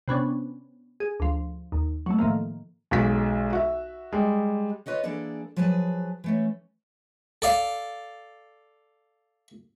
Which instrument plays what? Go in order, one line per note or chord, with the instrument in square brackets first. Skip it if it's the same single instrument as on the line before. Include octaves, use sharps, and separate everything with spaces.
[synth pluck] C3 B3 C#4 D4
G#4
D2 F3
D#2
F#3 A3
A2 D#3 F3 A#3
[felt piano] B1 G#3 F#4 B6
F#4 E5
G3 G#3
[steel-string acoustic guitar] F4 B4 C#5 D#5 F#5
E3 A#3 D4 G#4 A4 D5
F3 F#3 G#4 B4 G#5 A5
E3 A3 C#4
[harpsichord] A4 D5 F5